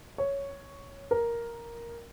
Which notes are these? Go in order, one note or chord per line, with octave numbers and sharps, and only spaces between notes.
C#5
A#4